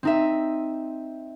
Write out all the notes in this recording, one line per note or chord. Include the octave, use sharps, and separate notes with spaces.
C4 D#4 E5